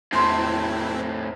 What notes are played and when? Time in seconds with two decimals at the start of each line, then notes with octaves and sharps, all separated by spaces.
0.13 E2 A2 C3 C4 E4 C6